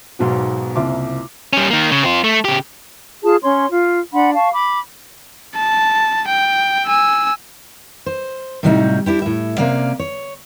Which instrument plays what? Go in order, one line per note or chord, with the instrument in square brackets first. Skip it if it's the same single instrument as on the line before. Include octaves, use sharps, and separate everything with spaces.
[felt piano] B1 G#2 B2 F#3
F#1 C2 C3 F4 D6
[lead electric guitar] G3 C#4
D#3 A#3
C#3
C4 F4
A3
C#3 G4
[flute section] F4 G#4 A5
C#4 C#5 C6
F4
D4 F#5 B5 C6
F5 A5 C#6
B5 D6
[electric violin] A5
G5
G#5 E6
[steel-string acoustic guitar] C5
A2 C3 F#3 G3 C#4 D#4
D4 E4 G4
A2 E5
C3 A#3 C#4 D5 F5
C#5